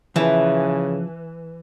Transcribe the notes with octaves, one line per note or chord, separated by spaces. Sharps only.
C#3 E3 F3 E4 B4